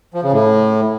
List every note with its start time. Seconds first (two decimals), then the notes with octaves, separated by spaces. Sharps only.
0.14 F3
0.23 C#3
0.32 A2